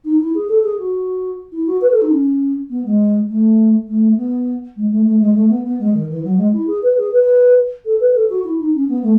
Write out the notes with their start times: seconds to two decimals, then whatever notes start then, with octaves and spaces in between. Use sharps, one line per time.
0.04 D#4
0.20 E4
0.34 G#4
0.49 A4
0.63 G#4
0.79 F#4
1.52 E4
1.66 F#4
1.81 B4
1.91 A4
2.01 D#4
2.11 C#4
2.69 B3
2.85 G#3
3.28 A3
3.87 A3
4.17 B3
4.76 G#3
4.91 A3
5.05 A3
5.20 G#3
5.35 A3
5.49 B3
5.65 B3
5.79 G#3
5.93 D#3
6.09 E3
6.24 F#3
6.37 G#3
6.53 E4
6.67 G#4
6.82 B4
6.97 G#4
7.11 B4
7.85 A4
8.00 B4
8.15 A4
8.29 F#4
8.44 E4
8.59 D#4
8.74 C#4
8.88 B3
9.02 A3